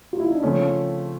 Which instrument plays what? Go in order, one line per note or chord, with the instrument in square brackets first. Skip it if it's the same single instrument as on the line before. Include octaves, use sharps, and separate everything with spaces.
[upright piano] F4
E4
D#4
D4
[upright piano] C#3 C#4 [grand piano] F3 A3 C4